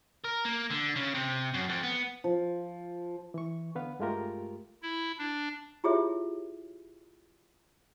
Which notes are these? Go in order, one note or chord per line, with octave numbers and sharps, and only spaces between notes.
A#4
A#3
D3
C#3
C3
F#2
F2
B3
F3
E3 C#6
D3 B3 B4 F5 F#5
G2 G#3 A3 F4 G4 A#4
E4
D4
E4 F4 G4 G#4 C#5 E5